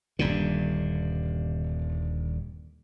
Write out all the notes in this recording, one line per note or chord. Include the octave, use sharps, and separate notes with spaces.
D#1 G2 D3